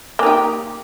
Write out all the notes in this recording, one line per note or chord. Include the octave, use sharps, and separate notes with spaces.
A#3 D#4 G4